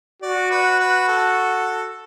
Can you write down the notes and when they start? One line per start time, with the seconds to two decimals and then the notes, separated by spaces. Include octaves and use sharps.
0.22 F#4 D5
0.51 B4
0.80 B4
1.08 A4